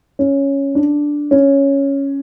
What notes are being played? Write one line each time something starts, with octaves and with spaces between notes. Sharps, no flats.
C#4
D4
C#4